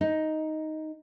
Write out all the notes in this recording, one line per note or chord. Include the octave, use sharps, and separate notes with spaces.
D#4